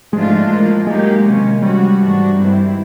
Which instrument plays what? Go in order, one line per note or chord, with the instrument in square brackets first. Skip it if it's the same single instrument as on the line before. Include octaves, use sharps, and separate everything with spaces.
[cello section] G#2 F3 A3 D4 F4 [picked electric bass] G#3
[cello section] A2 F3 A#3
[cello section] F#3 A#3 D#4 G4 [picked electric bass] G#3
[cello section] C3 D#3 F#3 A#3 C#4
[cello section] F3 G#3 C#4 F#4 [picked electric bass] G3
[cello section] G#2 E3 A3 D4 F#4
G2 D#3 G#3 C4 E4